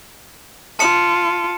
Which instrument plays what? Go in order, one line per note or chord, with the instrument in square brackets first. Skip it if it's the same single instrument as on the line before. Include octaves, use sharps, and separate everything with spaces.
[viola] F4 [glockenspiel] A5 C#7 E7